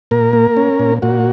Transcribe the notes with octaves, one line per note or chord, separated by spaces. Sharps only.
A#2 A#4
A#3
C#4
A#2
A#2 F#4